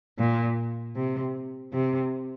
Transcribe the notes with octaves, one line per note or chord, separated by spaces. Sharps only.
A#2
C3
C3